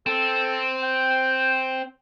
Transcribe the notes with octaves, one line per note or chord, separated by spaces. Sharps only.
C4 A4
G5